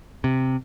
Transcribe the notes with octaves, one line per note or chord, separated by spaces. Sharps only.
C3